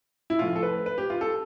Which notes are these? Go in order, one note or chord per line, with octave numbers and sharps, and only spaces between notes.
E4
A2 F3 F4
A4
B4
B4
G4
F4
A4